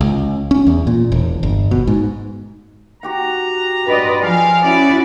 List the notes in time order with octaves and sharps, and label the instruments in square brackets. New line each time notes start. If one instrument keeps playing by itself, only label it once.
[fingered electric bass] C#2
C#4
E2
A#2
E1
G1
B2
G#2
[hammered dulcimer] F#4 G4 F#5 [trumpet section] A#5
[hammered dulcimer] G2 F#5 C6 [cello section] B4 D5 D#5
[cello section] F3 [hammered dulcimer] G#4 G5 [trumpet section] A#4 F5
[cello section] C#4 E4 F#4 [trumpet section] D5